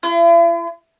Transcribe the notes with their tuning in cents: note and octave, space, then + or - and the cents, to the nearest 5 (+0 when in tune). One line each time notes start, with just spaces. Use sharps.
E4 +45